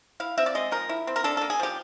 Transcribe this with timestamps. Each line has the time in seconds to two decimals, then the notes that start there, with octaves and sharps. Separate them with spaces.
0.20 E4 F5
0.38 C4 E5
0.46 D5
0.55 G#3 D#5
0.71 F3 A#4
0.89 E4
1.07 C4
1.16 A#4
1.24 D4 A4
1.37 A#3 A4
1.50 G#4
1.59 F3 G4